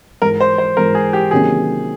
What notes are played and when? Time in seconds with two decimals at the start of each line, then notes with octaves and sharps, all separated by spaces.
0.22 G#2 E3 G#3 A#4
0.41 C5
0.58 C5
0.77 G#2 E3 G#3 A#4
0.95 G#4
1.13 G4
1.31 C3 D#3 F#3 A#3 C#4 G#4